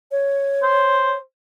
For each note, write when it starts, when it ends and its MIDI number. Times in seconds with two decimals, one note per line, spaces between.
0.11 1.17 73
0.63 1.16 72